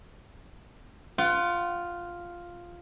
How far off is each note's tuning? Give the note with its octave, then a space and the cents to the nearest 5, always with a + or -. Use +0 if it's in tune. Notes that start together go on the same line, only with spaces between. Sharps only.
F4 +0 F#5 +30